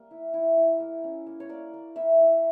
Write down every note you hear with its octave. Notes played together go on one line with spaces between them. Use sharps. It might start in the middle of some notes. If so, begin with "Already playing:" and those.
Already playing: G3 A#3
E4
E4
E4
A#3
C#4
A#3
C#5
A#3 D5
A#3
E4 E5
E4